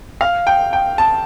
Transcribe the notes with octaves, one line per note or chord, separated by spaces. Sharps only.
F5
G5
G5
A5